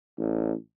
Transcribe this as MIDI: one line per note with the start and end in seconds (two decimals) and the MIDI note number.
0.18 0.53 33